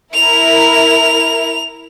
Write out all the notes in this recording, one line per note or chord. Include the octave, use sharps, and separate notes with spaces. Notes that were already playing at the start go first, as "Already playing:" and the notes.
E4 A#4 F7